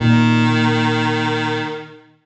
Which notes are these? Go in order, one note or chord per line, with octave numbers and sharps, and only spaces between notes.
A#2 D#3